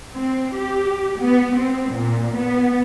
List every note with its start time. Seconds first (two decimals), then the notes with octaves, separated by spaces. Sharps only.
0.13 C4
0.54 G4
1.20 B3
1.56 C4
1.93 A#2
2.36 B3